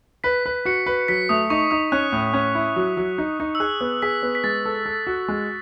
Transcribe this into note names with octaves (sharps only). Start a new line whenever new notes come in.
B4 B6
B4
F#4 C#7
B4
F#3 B6
A3 D#6
D#4 C#6
D#4 D#6
C#4 F#6
A2
C#4
E4
F#3
F#3
D#4
D#4
E6
G#4 F#6
B3
G#4 B6
B3
B6
G#3 A6
A4
A4
F#4
G#3